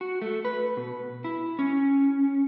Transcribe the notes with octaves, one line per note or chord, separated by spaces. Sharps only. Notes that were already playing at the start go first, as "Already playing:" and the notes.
F#4
A3
B4
B2
E4
C#4